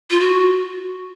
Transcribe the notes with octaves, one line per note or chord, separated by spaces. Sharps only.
F4
F#4